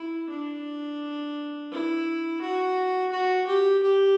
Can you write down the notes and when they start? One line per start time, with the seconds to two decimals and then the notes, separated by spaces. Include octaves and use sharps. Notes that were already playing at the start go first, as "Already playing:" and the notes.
Already playing: E4
0.30 D4
1.71 E4
2.41 F#4
3.12 F#4
3.47 G4
3.83 G4